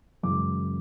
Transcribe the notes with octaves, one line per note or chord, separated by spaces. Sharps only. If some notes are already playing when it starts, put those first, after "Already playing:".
F#2 C#3 E3 G#3 D6